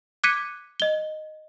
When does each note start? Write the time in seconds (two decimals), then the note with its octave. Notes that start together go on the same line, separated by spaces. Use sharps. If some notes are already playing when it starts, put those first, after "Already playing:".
0.24 D6 F#6 G#6 B6 C#7 D#7
0.80 D#5 G7